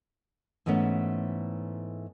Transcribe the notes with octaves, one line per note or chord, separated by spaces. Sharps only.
G#2 E3 A3 B3 C#4